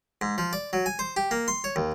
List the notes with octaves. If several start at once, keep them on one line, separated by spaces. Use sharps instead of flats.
G#2
F3
D5
F#3
G#5
C5
G4
A#3
C6
C#5
D#2